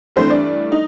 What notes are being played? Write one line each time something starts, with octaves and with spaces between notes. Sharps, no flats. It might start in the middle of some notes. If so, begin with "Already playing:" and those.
G2 E3 A3 C4 D4 C5
D4 D5
D#4